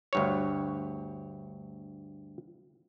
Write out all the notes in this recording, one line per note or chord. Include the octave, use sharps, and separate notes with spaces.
D2 G2 C#5